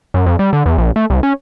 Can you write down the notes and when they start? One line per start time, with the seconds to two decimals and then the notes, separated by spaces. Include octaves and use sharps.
0.14 F#2
0.26 F2
0.39 G3
0.53 D3
0.66 E2
0.78 A#1
0.96 A3
1.10 C2
1.23 C#4